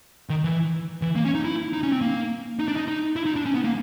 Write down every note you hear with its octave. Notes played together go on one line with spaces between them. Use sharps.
D#3
E3
E3
A#3
C#4
D#4
E4
D#4
C#4
C4
A#3
D#4
D4
D#4
D#4
E4
D#4
D4
C#4
B3
A#3